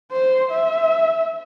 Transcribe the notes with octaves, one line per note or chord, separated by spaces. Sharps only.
C5
E5